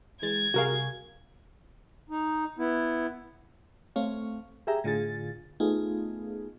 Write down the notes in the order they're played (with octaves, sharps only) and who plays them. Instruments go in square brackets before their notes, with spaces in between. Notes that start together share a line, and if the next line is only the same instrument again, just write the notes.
[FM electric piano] E3 G#3 A6 [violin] G#6
[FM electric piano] C2 G3 G#4 [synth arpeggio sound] F#4 A#4 F5
[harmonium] D#4
B3 E4
[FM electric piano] A3 C4 C#5 F5
G4 G#4 E5 G5 A#5
A2 D3 F4 G#4 A6
A3 B3 D#4 F4 G#4